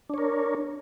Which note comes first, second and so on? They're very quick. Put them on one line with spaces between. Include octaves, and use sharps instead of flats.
D4 C#5 A#4